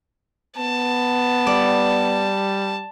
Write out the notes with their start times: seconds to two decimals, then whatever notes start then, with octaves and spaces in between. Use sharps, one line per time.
0.58 B3 A5
1.47 G3 D5